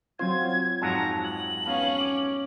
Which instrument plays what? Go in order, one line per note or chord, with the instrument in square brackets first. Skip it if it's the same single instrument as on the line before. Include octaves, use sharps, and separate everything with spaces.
[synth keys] F#3 C4 F4 [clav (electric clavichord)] C5 [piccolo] G#6
[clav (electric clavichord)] F2 G#2 F#3 [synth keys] A5 [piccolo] A#5
[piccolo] F#7
[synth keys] B3 F5 [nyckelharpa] C#4
[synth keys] D6